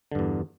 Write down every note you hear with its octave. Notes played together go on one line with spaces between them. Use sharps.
E2 G2 D3